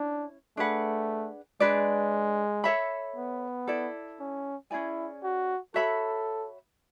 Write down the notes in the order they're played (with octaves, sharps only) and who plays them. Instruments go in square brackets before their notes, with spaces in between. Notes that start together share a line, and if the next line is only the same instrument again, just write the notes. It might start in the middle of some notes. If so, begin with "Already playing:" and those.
Already playing: [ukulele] C#4 E4 [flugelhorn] D4
[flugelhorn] A3 [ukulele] D4 G#4 B4 F#5
[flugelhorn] G#3 [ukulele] D4 G#4 B4 D5
[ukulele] A4 C#5 E5 B5
[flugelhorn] B3
[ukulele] E4 A4 D5
[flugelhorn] C#4
[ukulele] C#4 G#4 D5 G#5 [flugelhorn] E4
[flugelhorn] F#4
[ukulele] F#4 C#5 E5 B5 [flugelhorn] A4